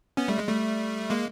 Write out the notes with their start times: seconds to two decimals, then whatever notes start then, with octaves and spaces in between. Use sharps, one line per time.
0.17 B3 C#4
0.28 G3 A3
0.38 G#3
0.48 G3 A3
1.10 G#3 A#3